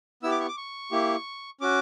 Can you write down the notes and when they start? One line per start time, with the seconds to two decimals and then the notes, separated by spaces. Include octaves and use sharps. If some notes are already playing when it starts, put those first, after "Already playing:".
0.23 B3 E4 G4 E6
0.31 D6
0.40 C#6
0.48 D6
0.57 C#6
0.91 A#3 E4 G4
1.61 C#4 F#4 D6